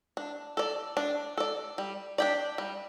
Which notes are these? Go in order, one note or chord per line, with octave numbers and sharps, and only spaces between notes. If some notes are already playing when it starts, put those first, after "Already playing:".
D4
A4 D5
D4
A4 D5
G3
D4 G4 D5
G3